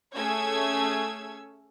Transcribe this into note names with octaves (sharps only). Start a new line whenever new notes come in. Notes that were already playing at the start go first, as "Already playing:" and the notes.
A3 C#4 G#4 C#5 E6 G#6